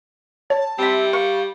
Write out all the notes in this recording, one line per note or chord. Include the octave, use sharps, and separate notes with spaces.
C#5 A5
G3 C4 E4
A#4 F5 C#6